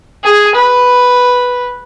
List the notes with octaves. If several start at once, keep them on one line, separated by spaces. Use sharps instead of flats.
G#4
B4